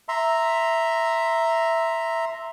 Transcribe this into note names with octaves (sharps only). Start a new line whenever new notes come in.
E5 A#5 C6